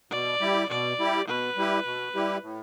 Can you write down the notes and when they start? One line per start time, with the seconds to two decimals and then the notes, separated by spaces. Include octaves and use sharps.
0.11 B2 D5
0.41 G3 E4 G4
0.69 B2 D5
0.98 G3 E4 G4
1.27 B2 B4
1.57 G3 E4 G4
1.85 B2
2.15 G3 E4 G4
2.43 A2